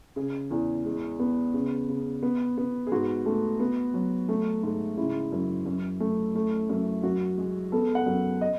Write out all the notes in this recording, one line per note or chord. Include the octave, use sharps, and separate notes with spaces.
C#3 G#4
E2
G#3
B3
C#3
C#3
B3
B3
G#4
G#2 F#4
A3
B3
F#3
A3
G#2
C#3 E4
F#2
F#2
A3
A3
F#2
F#2 F#4
G#3 G#4
B3 A4
F#5
F#2
D#5